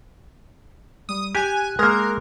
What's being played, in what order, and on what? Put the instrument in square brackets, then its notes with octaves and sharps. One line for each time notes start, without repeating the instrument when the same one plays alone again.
[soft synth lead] G3 [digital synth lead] D#6
[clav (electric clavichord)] G4 [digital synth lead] G#5 [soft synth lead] F#6
[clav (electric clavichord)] G#3 A#3 [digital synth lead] A#4